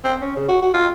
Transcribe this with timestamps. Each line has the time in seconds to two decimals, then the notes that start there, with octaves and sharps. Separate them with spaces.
0.04 C4
0.22 C#4
0.36 C#3
0.48 F#4
0.62 F#4
0.74 F4